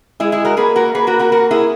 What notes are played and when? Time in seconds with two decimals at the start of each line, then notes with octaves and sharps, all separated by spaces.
0.20 G#3 E4 G#4
0.32 E4 G#4
0.45 F#4 A#4
0.57 A#3 G#4 B4
0.76 F#4 A#4
0.95 A#3 G#4 B4
1.07 F#4 A#4
1.19 F#4 A#4
1.32 F#4 A#4
1.51 E4 G#4